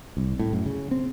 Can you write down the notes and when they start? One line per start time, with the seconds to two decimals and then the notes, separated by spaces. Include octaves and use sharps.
0.17 C2
0.39 A2
0.53 F#2
0.66 C#3
0.91 C4